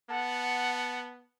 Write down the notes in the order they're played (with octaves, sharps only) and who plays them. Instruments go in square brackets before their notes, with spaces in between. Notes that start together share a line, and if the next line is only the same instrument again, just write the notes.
[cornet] B3 [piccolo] F#5 [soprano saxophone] A5